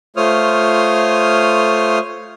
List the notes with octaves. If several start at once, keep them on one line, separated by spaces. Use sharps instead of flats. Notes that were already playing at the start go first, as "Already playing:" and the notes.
A3 F4 C5 C#5 D#6 F6